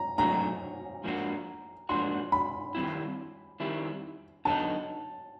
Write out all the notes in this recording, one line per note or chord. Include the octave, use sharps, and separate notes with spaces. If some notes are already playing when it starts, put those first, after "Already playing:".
Already playing: A#5
A2 F#3 A3 D4 F#4 A#5
G#2 F3 A#3 D4 F#4
G#2 F3 A#3 D4 F#4 C6
B5
D#3 G3 C4 E4
D#3 G3 C4 E4
D3 F#3 B3 D#4 A5